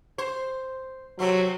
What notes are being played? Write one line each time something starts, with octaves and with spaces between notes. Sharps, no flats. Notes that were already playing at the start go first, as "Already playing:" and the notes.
C5
C3 F#3 A3 C4